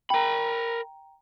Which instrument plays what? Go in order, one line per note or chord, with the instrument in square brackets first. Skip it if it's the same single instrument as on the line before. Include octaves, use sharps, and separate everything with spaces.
[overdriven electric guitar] A#4 B5 [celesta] G5 A#5